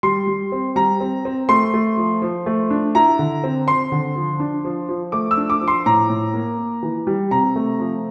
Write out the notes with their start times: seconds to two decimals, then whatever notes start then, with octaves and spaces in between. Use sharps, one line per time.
0.03 G3 C6
0.27 G3
0.52 C4
0.76 G3 A#5
1.00 C4
1.25 C4
1.49 A3 C6
1.74 A3
1.97 F3
2.22 F3
2.46 A3
2.70 D4
2.95 E4 A#5
3.19 D3
3.44 C4
3.68 C4 C6
3.92 D3
4.16 F3
4.40 D4
4.65 F3
4.89 F3
5.12 A3 D6
5.31 E6
5.37 D4
5.50 D6
5.61 F3
5.68 C6
5.86 A2 A#5
6.09 A2
6.34 A#3
6.58 A#3
6.83 E3
7.07 G3
7.31 C3 A#5
7.56 A3
7.80 F3